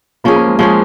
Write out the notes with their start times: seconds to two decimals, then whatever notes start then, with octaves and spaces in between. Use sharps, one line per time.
0.24 F3 A#3 C#4 G#4
0.36 A#3
0.47 G#3
0.59 F3 G#3 C#4 G#4